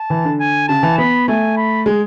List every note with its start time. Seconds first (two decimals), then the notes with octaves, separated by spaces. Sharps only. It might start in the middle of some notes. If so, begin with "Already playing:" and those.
Already playing: A5
0.10 E3
0.25 D3
0.40 G#5
0.68 C#3 A5
0.83 E3
0.98 B3 B5
1.28 A3 G#5
1.57 B5
1.86 G#3